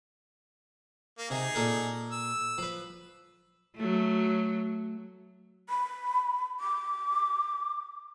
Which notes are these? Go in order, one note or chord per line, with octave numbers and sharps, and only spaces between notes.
A#3
C3 D#4 G#4
A#2 A4 A#4
E6
F3 B4
F#3 A3
B5
D6